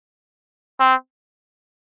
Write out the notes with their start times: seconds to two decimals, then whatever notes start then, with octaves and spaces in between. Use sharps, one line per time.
0.80 C4